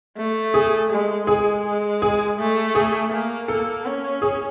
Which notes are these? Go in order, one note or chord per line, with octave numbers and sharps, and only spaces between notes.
A3
G#4
G#3
G#3 G#4
G#4
A3
G#4
A#3
A#3 A4
C#4
G#4